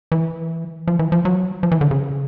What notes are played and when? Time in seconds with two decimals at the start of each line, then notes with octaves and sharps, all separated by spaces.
0.12 E3
0.88 F3
0.99 E3
1.12 F3
1.25 F#3
1.63 F3
1.72 E3
1.81 D3
1.91 C#3